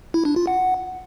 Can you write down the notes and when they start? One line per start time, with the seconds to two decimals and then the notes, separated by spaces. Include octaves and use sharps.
0.14 E4
0.25 D4
0.36 F4
0.47 F#5